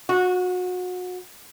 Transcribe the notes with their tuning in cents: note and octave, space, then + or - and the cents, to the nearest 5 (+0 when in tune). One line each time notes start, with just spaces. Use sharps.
F#4 -30